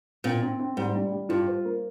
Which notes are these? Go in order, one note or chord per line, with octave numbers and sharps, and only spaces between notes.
A#2 C4
C4
C4
G#2 G3
G3
G3
G2 F4
C5
A#3